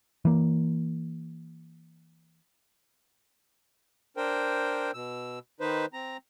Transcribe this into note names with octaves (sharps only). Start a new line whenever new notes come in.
E3 A#3
D4 A#4 C5 G5
B2 E6
D#3 D#4 B4 C5
C4 A#5